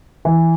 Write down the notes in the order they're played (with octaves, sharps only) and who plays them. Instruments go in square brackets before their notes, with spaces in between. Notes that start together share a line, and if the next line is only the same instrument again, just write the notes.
[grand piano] E3